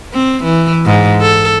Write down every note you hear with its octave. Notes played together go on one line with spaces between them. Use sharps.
C4
E3
G#2
A4